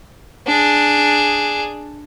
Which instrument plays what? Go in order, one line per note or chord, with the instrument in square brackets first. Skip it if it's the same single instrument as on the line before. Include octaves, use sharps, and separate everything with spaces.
[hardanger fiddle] D4 G#4